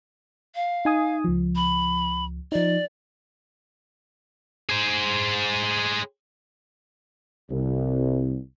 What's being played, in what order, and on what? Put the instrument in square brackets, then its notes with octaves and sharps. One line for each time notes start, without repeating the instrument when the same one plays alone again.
[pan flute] F5
[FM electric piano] D#4 G#5 D#6
C#2 F3
[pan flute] B5
[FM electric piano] F3 D#4 [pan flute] D5
[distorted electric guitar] G#4 C5
[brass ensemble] C2